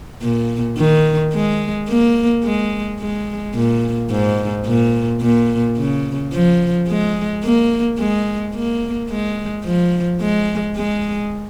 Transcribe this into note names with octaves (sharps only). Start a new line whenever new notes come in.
A#2
D#3
G#3
A#3
G#3
G#3
A#2
G#2
A#2
A#2
C#3
F3
G#3
A#3
G#3
A#3
G#3
F3
G#3
G#3